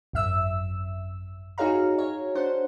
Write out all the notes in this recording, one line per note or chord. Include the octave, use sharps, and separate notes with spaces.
G#1 F#2 E5 E6
D#4 F#4 G#4 C#5 F5 A#5
C#5
D4 C5 F#5